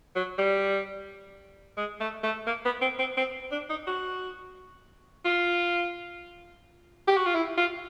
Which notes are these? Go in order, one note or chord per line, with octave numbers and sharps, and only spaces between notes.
F#3
G3
G#3
A3
A3
A#3
B3
C4
C4
C4
D4
D#4
F#4
F4
G4
F#4
F4
E4
F4